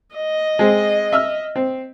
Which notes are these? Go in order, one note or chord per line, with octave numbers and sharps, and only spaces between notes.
D#5
G#3 C4
E5 E6 F6
C4